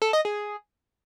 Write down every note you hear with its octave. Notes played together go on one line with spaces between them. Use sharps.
A4
D#5
G#4